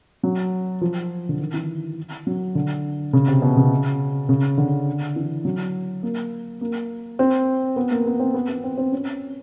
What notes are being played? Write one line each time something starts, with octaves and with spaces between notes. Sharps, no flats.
F#3
F3
D3
D#3
E3
F#3
D3
C#3
C3
B2
C#3
C#3
D3
E3
F#3
A#3
A#3
C4
B3
A#3
B3
C4
B3
B3
C4
C4
C#4